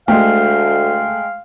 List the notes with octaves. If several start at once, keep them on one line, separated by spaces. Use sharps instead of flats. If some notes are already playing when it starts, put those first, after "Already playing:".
D2 G#3 A3 F5 G5